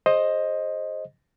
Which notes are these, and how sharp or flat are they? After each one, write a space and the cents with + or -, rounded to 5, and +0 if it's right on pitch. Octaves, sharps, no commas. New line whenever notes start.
G#4 +0 C5 +20 D#5 +0